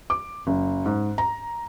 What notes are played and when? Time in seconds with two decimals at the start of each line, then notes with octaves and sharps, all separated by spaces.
0.10 D6
0.47 F#1
0.86 G#2
1.18 A#5